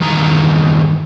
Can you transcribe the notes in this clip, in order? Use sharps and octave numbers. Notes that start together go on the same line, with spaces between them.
E2 G2 D#3 A#5